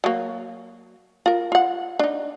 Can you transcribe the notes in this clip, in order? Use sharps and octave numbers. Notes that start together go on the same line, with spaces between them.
F#3 A#3
F4 A#4
F4 F#5
D4 D#4